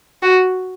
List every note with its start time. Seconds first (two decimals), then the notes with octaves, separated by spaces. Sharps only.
0.23 F#4